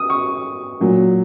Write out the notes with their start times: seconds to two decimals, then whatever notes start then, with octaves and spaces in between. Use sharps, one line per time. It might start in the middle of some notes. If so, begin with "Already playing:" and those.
Already playing: D#6
0.10 C#6
0.80 A#2 F#3